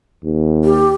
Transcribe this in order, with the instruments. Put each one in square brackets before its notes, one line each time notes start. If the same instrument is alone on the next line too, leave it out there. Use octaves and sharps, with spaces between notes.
[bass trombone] D#2
[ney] G4